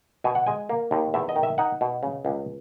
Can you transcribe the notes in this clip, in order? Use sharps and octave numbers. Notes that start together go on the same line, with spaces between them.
B2 G#5
F#5
G#3 G#5
A#3
D#2
E2 E5
D#5
D#3
E5
D#4 F#5
B2
C#3
C#2